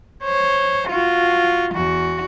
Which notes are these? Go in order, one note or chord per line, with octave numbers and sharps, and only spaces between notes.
C5 C#5
F4 F#4
E2 F#4